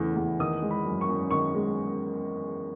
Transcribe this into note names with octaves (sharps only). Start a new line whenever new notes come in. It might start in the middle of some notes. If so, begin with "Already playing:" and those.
Already playing: E2 C#3 E3 A3
E2
D#3 D#6
G#3
B5
F#2
C#6
F#2
D#3 C#6
G#3